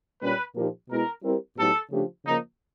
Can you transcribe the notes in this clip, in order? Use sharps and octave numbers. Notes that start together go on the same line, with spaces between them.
A#2 G3 A#3 C#4 B4
A#2 F3 A#3 D#4 G4
B2 G#3 B3 E4 A#4
G3 C4 E4 G4 A#4
A2 F#3 B3 D#4 G4 A4
C#3 F3 A3 D4 G4
C#3 F3 A#3 D#4